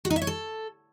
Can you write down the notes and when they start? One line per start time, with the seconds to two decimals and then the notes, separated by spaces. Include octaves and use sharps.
0.05 F#4
0.10 D#4
0.16 E5
0.22 C#5
0.27 A4